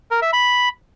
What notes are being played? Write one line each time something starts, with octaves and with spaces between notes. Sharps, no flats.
A#4
E5
B5